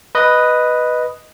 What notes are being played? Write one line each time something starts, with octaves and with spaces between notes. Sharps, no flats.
B4 D#5